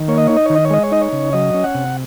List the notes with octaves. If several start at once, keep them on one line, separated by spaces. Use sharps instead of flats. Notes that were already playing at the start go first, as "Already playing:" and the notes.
Already playing: D#3
A#3 C#5
D#5
D#4 C#5
D#5
C#5
D#3
D#5
C#5
G#3 D#5
C#5
D#4 D#5
C#5
C#3
F#3 D#5
C#4
F#5
C3